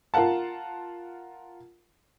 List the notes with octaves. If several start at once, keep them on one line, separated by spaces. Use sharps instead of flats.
F4 A#4 F5 F#5 A5